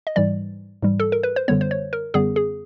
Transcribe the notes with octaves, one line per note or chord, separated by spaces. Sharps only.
D#5
G#2 E3 G3 D5
G#2 E3 G3
A4
A#4
B4
C5
F#2 D3 G3 B3 C#5
C5
C#5
A#4
F#2 D3 G3 B3 G#4
G#4